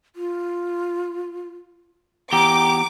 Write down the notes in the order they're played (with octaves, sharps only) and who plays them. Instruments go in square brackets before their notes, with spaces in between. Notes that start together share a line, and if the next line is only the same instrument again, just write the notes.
[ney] F4
[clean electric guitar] E2 G4 [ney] A#5 [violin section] D6